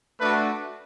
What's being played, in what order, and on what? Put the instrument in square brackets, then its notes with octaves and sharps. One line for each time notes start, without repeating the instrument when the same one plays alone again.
[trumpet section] A3 D4 F#4 B4